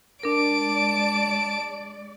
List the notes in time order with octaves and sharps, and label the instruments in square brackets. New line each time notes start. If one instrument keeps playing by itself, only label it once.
[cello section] G#3 D5 [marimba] D4 A#4 [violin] A5 D7